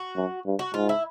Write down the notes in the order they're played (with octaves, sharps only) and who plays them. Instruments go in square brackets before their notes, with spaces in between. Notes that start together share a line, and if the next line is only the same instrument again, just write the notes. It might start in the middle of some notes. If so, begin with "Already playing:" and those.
Already playing: [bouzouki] F#4
[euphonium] F#2
G2
[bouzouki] F#4
[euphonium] G#2 [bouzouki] F4
[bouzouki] E4